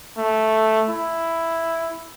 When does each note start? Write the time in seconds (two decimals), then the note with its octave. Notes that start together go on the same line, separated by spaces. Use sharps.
0.18 A3
0.90 E4